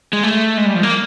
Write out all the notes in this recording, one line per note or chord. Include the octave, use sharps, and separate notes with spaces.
G#3
A3
G#3
G3
F3
A#3